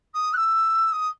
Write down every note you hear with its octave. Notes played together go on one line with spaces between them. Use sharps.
D#6
F#6
E6
D#6